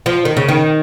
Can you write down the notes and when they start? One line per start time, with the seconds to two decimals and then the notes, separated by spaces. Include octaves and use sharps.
0.06 F3
0.25 D#3
0.37 C#3
0.48 D#3